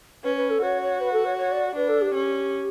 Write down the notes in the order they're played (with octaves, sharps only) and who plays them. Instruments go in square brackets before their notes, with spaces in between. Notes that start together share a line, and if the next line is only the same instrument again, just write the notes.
[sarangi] C#4 [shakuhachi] B4
[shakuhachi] B4
A4
[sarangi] F#4 [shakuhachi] C#5
[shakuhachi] C#5
B4
A4
C#5
C#5
D5
[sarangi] D4 [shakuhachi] B4
[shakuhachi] A4
G4
[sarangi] C#4